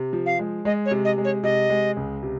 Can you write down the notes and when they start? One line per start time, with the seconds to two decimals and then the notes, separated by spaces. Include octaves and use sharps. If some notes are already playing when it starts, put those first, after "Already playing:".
Already playing: C3
0.13 F3
0.26 F5
0.39 G#3
0.65 G#3 D#5
0.86 C#5
0.91 C3
1.05 D#5
1.18 G#3
1.25 C#5
1.43 C3 D#5
1.70 G#3
1.97 C#2
2.23 C3